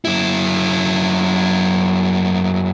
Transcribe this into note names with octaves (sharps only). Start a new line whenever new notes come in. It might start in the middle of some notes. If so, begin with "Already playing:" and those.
F#2 E4